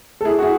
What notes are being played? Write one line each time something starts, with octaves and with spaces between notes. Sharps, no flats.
A4
E4 G#4
F#4
E4 G#4